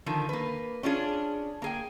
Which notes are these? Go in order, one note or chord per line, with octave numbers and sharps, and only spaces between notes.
D3 D#3 F3
A#3 B4
C#4 D4 F4 G#4
A#3 G#4 G5